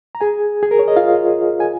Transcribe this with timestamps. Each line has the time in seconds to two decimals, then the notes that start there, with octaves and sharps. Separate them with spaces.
0.15 A#5
0.21 G#4 G#5
0.63 G#4
0.71 A#4
0.79 C#5
0.88 D#5
0.96 F4 F5
1.60 G#5